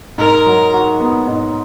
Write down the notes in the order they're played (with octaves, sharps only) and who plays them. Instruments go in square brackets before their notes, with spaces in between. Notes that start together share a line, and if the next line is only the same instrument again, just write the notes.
[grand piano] G#2 [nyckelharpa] A#4
[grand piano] F#3
F#4
B3
G#2